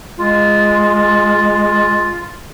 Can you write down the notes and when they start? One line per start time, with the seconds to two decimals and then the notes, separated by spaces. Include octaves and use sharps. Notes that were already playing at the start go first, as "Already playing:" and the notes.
0.17 G#3 F4